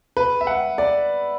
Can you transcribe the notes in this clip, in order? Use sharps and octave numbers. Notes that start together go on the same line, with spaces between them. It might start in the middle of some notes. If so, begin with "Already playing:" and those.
B4
E5
F#5
D5